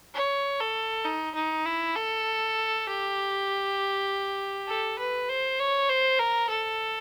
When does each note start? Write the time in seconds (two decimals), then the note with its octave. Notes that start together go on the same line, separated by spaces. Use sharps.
0.14 C#5
0.60 A4
1.05 D#4
1.35 D#4
1.66 E4
1.96 A4
2.87 G4
4.68 A4
4.99 B4
5.29 C5
5.59 C#5
5.89 C5
6.19 A#4
6.50 A4